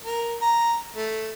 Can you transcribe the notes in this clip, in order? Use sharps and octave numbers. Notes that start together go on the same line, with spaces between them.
A#4
A#5
A3